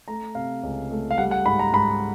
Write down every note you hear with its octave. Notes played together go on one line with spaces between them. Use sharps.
A3 A#5
C3 F5
C#2
A3
F5
G3 F#5
F#5
G#2 B5
A#5
G#2 B5